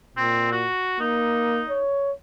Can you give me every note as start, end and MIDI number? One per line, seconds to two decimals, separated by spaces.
0.17 0.68 46
0.17 0.49 60
0.52 0.98 66
1.00 1.62 58
1.00 1.82 63
1.69 2.12 73